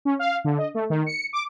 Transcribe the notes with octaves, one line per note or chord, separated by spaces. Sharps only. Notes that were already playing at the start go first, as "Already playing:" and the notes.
C#4
F5
D3
D#5
A3
D#3
C#7
D6